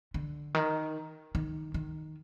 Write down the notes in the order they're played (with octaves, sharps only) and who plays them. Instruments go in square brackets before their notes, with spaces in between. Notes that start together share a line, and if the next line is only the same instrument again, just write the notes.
[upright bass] D3
D#3
D#3
D#3